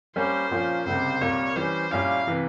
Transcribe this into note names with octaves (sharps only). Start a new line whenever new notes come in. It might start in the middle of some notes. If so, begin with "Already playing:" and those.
G3 A#3 C#4 C5
A#2 F3 A#3 C#4 F4
C#2 C3 G3 A#3 C5
C2 A#2 G3 A#3 C#5
E3 G3 C#4 C5
A#2 G3 C#4 E4 F5
C3 E3